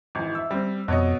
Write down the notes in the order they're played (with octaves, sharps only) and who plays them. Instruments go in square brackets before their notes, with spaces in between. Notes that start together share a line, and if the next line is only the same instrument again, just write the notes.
[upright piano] G#1 E3
E5 E6
G3 C4
[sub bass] F2 [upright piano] B2 C#5 D#5